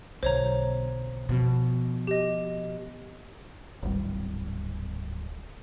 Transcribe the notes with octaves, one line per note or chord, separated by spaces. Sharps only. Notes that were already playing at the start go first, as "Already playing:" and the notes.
B1 D3 C5 C#5 A#5
B2 F3
G4 D#5
D1 G#1 G3